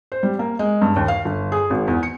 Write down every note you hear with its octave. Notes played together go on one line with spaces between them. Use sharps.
C5
G3
A#3
G#3
G2
D#2
F5
G1
G#4
G#1
E2
C#7